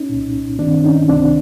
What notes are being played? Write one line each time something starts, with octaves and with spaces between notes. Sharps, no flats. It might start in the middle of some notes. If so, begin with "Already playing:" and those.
Already playing: C#4 D#4
C2 A#2
G2 D#3 C4 D4
C#4 D#4
C#2 C3 D#3 C4 D4